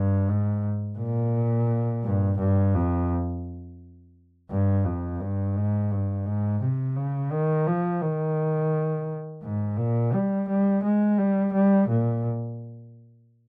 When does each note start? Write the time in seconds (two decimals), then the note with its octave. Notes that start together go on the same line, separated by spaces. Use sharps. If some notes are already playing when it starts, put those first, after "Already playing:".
Already playing: G2
0.28 G#2
0.99 A#2
2.04 G2
2.38 G2
2.75 F2
4.51 G2
4.85 F2
5.20 G2
5.56 G#2
5.91 G2
6.26 G#2
6.61 C3
6.96 C#3
7.32 D#3
7.67 F3
8.02 D#3
9.43 G#2
9.77 A#2
10.14 G3
10.49 G3
10.84 G#3
11.18 G3
11.53 G3
11.89 A#2